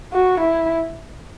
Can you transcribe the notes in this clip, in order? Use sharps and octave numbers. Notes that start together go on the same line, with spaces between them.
F#4
E4